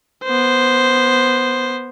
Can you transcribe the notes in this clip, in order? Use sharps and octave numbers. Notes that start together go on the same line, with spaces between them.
B3 C5